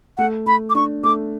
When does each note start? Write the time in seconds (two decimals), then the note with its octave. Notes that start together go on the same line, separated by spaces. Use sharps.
0.18 A3 F#5
0.46 A3 B5
0.70 D6
0.75 D4 C#6
1.03 A3 D6